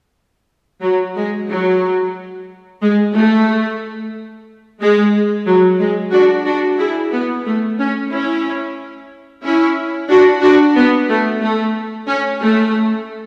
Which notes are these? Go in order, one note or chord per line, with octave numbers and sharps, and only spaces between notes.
F#3
G#3
F#3
G#3
A3
G#3
F#3
G#3
D4 F#4
D4 F#4
E4 G#4
B3
A3
C#4
C#4 E4
C#4 E4
D4 F#4
D4 F#4
B3
A3
A3
C#4
A3